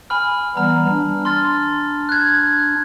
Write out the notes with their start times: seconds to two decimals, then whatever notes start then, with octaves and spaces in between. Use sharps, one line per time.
0.10 G#5 B5 F6
0.57 E3 G3 B3 A#5 F6
0.89 D4
1.25 C6 F6 A6
2.09 F#6 G#6